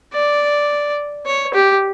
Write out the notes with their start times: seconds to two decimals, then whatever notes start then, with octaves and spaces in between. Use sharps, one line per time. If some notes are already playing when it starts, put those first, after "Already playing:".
0.13 D5
1.26 C#5
1.54 G4